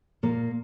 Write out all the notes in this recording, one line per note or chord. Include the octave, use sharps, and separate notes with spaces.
A#2 A#3